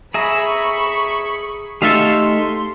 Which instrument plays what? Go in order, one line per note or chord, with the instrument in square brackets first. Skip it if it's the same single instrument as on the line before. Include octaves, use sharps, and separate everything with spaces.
[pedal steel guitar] G#4 E5 A#5 [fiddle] B5 C#6
[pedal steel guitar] A3 D#4 G4 [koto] A4 E5 F5 [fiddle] C6